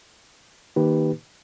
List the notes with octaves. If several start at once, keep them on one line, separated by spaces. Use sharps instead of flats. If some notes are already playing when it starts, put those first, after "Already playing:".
D#3 A#3 D#4 G4 B4